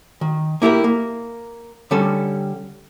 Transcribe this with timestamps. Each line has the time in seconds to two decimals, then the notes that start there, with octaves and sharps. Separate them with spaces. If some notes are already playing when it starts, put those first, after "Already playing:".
0.21 D#3
0.62 A#3 E4 G4 G#4 A#4
0.84 A#3
1.91 D3 G3 C#4 A4